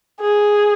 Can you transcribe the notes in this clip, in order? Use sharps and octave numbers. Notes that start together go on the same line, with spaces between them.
G#4